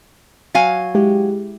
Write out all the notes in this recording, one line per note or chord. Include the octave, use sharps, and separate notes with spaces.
F#3 F5 G#5
G#3 E4 G4